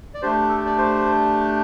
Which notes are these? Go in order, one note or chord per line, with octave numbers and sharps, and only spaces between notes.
D5
A3 D4 G4 C5
A4
D5
C5